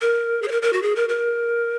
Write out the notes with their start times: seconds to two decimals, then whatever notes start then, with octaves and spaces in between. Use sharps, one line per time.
0.01 A#4
0.42 G#4
0.48 C#5
0.51 A#4
0.62 A#4
0.73 F#4
0.82 G#4
0.96 A#4
1.09 A#4